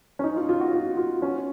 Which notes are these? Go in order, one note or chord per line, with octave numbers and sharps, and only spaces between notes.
C#4
D#4
F4
F4
F#4
F4
F4
C#4